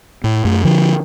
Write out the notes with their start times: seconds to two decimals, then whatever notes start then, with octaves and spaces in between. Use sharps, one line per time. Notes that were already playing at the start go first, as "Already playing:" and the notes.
0.24 A2
0.45 F#2 A3
0.64 D3 F3